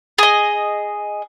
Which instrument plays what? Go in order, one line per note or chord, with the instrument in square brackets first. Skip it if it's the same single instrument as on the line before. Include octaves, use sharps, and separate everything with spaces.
[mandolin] G#4 D#5